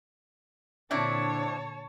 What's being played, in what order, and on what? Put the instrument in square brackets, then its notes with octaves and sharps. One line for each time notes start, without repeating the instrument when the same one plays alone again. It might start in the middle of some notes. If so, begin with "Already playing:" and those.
[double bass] A#2 D3 [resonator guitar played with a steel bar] C4 D4 E4 [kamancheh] C#5 A5